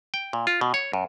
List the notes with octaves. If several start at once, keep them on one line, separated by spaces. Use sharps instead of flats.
G5
A#2
F4
B2
C#5
F#2